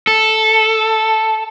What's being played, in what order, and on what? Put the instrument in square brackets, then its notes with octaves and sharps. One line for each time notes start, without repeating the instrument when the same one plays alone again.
[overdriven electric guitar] A4